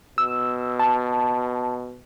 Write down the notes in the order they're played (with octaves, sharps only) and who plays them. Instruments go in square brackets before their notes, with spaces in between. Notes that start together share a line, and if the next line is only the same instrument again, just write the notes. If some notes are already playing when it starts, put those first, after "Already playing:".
[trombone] B2 [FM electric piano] E6
[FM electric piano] A5